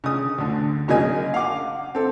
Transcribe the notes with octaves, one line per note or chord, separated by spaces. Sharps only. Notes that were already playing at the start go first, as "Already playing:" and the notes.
C#3 D#6
D2 D3
F#2 C#3 F#3 A#3 D#5 G#5
F5 F#5 D6
C4 A4